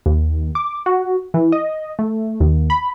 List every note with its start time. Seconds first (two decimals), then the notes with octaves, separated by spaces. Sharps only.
0.06 D#2
0.55 D6
0.86 F#4
1.34 E3
1.52 D#5
1.99 A3
2.40 D#2
2.70 B5